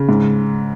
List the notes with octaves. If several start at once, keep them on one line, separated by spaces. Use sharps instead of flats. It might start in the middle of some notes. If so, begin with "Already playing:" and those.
Already playing: C#3
G#2